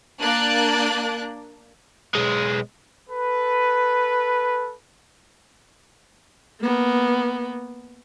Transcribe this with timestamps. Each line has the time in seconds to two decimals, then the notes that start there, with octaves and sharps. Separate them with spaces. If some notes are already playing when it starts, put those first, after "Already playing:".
0.22 A#3 D4 D5 F#6
2.15 B1 G#3
3.10 A4 B4
6.60 A#3 B3